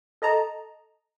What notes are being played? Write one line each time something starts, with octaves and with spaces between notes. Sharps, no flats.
A4 D#5 A5 A#5